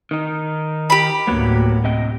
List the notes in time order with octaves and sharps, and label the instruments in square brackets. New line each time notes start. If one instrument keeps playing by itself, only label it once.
[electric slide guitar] D#3 D#4
[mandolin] G4 B5
[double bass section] D2 A2 [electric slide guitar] F#3 A#3 B3
[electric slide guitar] C3 D#5 G5